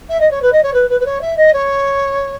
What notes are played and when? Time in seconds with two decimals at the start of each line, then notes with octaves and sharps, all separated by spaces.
0.09 E5
0.20 D#5
0.30 C#5
0.42 B4
0.52 D#5
0.63 C#5
0.73 B4
0.89 B4
1.00 B4
1.05 C#5
1.21 E5
1.37 D#5
1.53 C#5